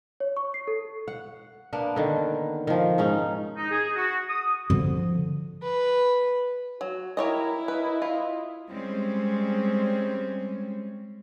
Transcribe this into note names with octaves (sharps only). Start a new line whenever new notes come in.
C#5
C#6
C7
A4
F#5
A#3 B3 D4
D3 D#3
D#3 F3
G#2 C#4 D#4
D#4
G#4
F#4
D#6
D3 F3
B4
F#3 F#4
E4 G4 A#4 C#5 D#5
B4 D#5
F4
G3 G#3 C4 C#4